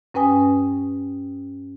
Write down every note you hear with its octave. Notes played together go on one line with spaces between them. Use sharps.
G2 C#4 B4 G5 G#5 D#6